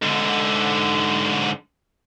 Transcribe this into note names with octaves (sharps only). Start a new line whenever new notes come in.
G#2 D3